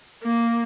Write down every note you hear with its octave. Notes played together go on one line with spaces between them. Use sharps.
A#3